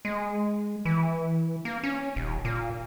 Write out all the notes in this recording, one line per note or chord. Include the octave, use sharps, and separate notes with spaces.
G#3
E3
A#3
C#4
D#1
A#2